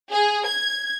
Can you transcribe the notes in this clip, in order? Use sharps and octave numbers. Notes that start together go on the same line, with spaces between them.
G#4
G#6